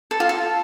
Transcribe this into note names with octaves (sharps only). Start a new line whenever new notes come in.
A4
F4
A4